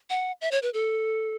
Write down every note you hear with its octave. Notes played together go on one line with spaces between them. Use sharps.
F#5
E5
C#5
B4
A4